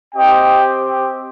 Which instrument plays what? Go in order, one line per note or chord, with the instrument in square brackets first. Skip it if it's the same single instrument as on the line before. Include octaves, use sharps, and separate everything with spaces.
[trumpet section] C4 G4 D#5 G5